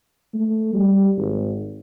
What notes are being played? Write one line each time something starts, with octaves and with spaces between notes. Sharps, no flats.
A3
G3
G#1